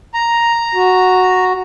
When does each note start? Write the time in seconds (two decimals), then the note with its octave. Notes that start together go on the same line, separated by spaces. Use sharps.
0.14 A#5
0.75 F#4